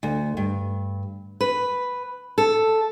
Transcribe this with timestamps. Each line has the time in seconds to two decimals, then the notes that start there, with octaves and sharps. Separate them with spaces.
0.03 D2
0.37 G2
1.41 B4
2.38 A4